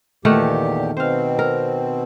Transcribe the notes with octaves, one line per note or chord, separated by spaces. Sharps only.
E2 A#2 D#3 A3 G4 F#5
B2 C4 C5 F5
A#4